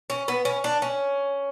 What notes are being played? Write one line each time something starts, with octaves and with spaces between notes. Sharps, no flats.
C#4
B3
C#4
D4
C#4